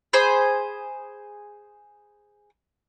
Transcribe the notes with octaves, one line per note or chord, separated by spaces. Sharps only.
G#4 C5 B5